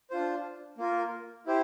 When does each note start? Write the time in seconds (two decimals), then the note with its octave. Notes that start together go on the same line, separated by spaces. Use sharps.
0.10 D4 F4 C5
0.78 A#3 F4 A#4
1.46 E4 G4 C5